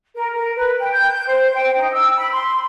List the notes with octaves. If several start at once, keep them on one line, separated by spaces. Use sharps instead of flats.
A#4
A#4
B4
G5
G6
G6
C5
G5
D#4
E6
B5
C6